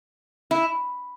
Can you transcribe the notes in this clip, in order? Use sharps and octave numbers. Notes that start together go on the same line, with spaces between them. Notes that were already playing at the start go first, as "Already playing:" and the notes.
E4